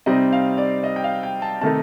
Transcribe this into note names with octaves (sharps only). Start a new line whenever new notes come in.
C3 G3 C4 D#4 D#5
F5
D5
D#5
G5
F5
G5
A5
C3 D#3 A3 D#4 A5